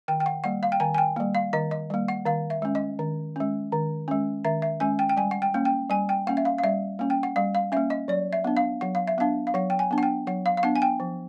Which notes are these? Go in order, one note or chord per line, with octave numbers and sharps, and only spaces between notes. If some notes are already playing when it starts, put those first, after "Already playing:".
D#3 G5
G5
F#5
G3 A#3 F#5
F5
G5
D#3 G#5
G#5
G5
G3 A#3
F5
D#3 D#5
D#5
G3 A#3
F#5
D#3 F5
E5
G#3 C#4
D#5
D#3
G#3 C#4
D#3
G#3 C#4
D#3 E5
E5
G#3 C#4 G#5
G5
G5
G3 G#5
F#5
G5
A#3 C#4
G5
G3 G#5
G5
A#3 C#4 F#5
E5
F5
F5
G3 E5
A#3 C#4
G5
F#5
G3 F5
F5
A#3 C#4 E5
D#5
F#3 D5
E5
B3 D4
F5
F#3 F#5
F5
E5
B3 D4 F5
F5
F#3 F#5
G5
G#5
B3 D4
F#5
G5
F#3 F#5
F5
F5
B3 D4 F#5
G#5
G5
F3